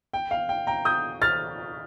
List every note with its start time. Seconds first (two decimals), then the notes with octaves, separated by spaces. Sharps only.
0.13 G5
0.31 F5
0.49 G5
0.67 G5 A#5
0.85 D#6 G6
1.22 F6 A6